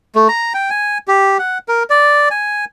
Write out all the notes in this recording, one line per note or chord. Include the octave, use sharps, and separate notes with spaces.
A3
A#5
G5
G#5
G4
F#5
A#4
D5
G#5